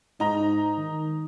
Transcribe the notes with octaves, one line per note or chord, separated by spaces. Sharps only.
G#2 D#4 A#5
D#3